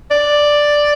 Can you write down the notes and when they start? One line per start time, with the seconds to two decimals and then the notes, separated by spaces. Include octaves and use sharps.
0.11 D5